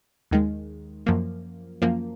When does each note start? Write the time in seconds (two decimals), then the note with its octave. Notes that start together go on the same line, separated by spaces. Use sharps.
0.31 D#2 D#3 G#3
1.06 F#2 F3 A#3
1.82 F#2 F3 A#3